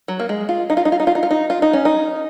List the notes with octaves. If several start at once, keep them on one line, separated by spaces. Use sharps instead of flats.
F#3
A#3
G#3
F4
D#4
F4
D#4
F4
D#4
F4
D#4
F4
D#4
F4
D#4
C#4
D#4